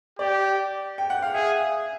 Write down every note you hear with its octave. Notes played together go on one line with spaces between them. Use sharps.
G4 D5
G5
F#5
F5
G#4 E5